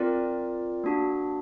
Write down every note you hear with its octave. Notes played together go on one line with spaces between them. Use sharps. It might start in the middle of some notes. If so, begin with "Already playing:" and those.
Already playing: C4 F4 A#4 D5
A#3 D4 F#4